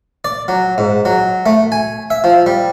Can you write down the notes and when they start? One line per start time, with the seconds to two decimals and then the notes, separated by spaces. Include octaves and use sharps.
0.24 D5
0.48 F#3
0.78 G#2
1.05 F#3
1.46 A3
1.72 G#5
2.10 E5
2.24 F3
2.46 G3